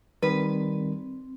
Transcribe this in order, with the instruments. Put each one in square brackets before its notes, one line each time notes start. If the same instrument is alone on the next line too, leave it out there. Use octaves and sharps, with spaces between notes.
[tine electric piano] D#3 G3 [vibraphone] C4 [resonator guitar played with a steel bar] B4